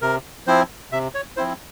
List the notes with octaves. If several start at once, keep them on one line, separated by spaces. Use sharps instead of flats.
C3 A#4
F3 C4 E4 C5
C3 E5
C#5
F3 C4 E4 C5